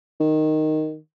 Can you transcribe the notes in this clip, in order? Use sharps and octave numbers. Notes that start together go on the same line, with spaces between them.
D#3